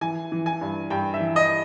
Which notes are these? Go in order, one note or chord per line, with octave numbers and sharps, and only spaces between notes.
E3 G#5
E3
G#5
G2
G2 G5
E5
E3
D#5